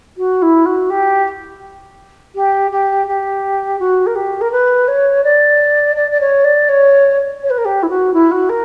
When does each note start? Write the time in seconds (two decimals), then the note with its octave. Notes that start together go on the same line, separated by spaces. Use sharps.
0.17 F#4
0.42 E4
0.65 F#4
0.90 G4
2.35 G4
2.71 G4
3.07 G4
3.79 F#4
4.06 A#4
4.15 G4
4.41 A#4
4.51 B4
4.87 C#5
5.23 D5
5.96 D5
6.11 D5
6.20 C#5
6.44 D5
6.68 C#5
7.43 C#5
7.50 B4
7.57 A#4
7.65 G4
7.82 E4
7.89 F#4
8.13 E4
8.31 F#4
8.49 A#4